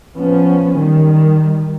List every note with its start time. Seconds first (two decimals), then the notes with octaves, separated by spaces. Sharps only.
0.17 F3 B3 C#4
0.78 D#3 G3